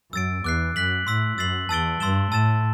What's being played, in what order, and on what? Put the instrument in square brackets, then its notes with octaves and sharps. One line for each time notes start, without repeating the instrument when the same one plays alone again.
[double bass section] F#2 [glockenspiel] E6 A6 D7
[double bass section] E2 [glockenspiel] D6 F#6 C7
[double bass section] F#2 [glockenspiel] F#6 B6 F#7
[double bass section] A2 [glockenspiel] C6 E6 B6
[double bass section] F#2 [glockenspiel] E6 A6 C7 F#7
[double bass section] E2 [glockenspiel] A5 E6 A6 D7 G7
[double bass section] G2 [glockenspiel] C6 E6 A6 E7 G7
[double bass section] A2 [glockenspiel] A5 E6 A6 E7